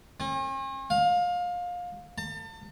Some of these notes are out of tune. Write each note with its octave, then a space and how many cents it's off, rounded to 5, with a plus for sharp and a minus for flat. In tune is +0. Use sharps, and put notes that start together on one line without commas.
C#4 -45
F5 +25
A5 +40